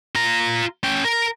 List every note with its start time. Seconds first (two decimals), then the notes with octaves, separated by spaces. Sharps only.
0.15 F4 A#5
0.83 C#4 G5
1.05 A#4